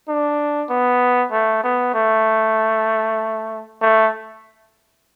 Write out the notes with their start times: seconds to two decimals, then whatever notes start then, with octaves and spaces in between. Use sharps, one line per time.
0.08 D4
0.70 B3
1.32 A3
1.64 B3
1.94 A3
3.81 A3